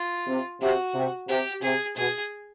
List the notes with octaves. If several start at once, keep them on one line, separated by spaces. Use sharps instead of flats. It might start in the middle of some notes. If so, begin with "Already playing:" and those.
Already playing: F4
C3
C3 F#4
C3
C3 G4
C3 G#4
B2 G#4